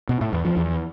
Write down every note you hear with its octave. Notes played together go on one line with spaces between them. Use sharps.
B2
A2
E2
F3
E2